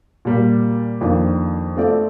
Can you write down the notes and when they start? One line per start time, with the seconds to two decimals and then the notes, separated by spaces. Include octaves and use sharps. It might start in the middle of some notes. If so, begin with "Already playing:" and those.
0.25 A#2 G3 A#3
1.01 F2 D#3 A#3 D4 F4
1.76 A3 C4 F4 A4 D5